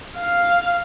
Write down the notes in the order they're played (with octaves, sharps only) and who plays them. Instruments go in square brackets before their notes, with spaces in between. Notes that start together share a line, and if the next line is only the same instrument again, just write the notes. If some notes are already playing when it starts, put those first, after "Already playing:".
[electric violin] F5